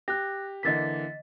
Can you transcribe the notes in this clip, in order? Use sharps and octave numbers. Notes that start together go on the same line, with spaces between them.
G4 F#6 A#6
D3 E3 A#3 D#5 A6 B6